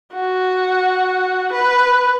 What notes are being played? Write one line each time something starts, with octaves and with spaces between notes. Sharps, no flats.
F#4
B4